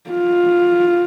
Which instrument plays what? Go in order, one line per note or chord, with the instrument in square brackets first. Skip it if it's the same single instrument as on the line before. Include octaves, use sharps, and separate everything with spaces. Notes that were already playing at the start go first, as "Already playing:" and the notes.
[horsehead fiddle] F4